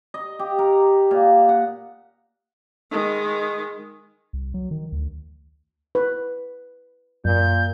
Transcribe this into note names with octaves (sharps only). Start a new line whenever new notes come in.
D#5
G4
A#4
A#2
F#5
D#3 G#3
C2
F#3
D#3
D2
B4
F#2 A#2 G6